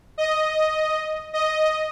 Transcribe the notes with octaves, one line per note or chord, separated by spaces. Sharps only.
D#5
D#5